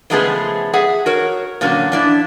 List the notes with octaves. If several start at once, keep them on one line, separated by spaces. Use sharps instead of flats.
C#3 F3 G#3 A3 B3 G#4
G#4 E5 F#5
F#4 A#4 C#5
A#2 D3 F#3 C#4 F#4
F3 D4 E4